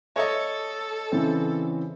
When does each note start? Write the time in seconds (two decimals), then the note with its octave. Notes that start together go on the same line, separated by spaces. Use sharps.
0.16 A4 C#5 D#5
1.12 C#3 E3 C4